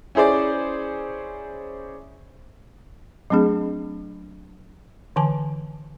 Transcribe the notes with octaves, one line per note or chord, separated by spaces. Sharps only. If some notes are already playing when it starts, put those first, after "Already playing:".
C#4 E4 G#4 C5 D5
F#3 A3 C4 D4 G#4
D3 E3 G#5 A5